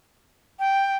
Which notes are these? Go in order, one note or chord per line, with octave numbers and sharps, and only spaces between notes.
G5